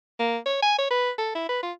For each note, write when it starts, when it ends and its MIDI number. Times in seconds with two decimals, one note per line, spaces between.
0.19 0.38 58
0.46 0.58 73
0.62 0.74 80
0.78 0.87 73
0.91 1.11 71
1.18 1.33 69
1.35 1.46 64
1.49 1.61 71
1.63 1.72 65